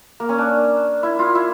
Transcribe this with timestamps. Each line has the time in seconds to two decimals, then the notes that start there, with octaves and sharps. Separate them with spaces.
0.20 A#3
0.29 C#4
0.38 D4
1.03 E4
1.19 F4
1.35 E4